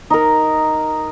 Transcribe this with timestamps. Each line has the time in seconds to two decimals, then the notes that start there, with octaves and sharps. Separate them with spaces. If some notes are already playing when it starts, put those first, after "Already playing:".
0.10 D#4 A#4